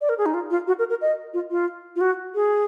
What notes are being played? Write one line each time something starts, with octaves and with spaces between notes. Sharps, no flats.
D5
A#4
G#4
D#4
F4
F4
F#4
A#4
A#4
D#5
F4
F4
F4
F#4
G#4